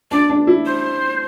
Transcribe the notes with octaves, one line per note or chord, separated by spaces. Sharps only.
D4 D5
D4
E4
C5